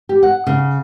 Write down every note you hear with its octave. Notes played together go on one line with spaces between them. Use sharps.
G4
F#5
C#3